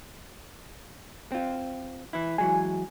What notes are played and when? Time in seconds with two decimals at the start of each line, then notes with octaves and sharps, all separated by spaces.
1.32 C4 F4
2.13 E3 E4
2.38 E3 F#3 G#3 G#5